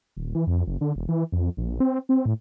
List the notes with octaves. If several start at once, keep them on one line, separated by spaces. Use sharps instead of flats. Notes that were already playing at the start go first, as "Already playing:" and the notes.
D#1
E3
F2
F#1
D3
E1
E3
F2
A#1
C4
C4
A2